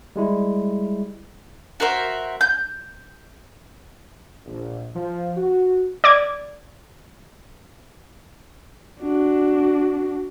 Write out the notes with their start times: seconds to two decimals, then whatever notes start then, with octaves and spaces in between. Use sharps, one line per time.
0.16 G3 G#3 E4
1.80 F#4 A#4 C5 E5
2.41 G6
4.46 A#1
4.95 F3
5.37 F#4
6.04 D5 D6 G#6
9.00 D4 F#4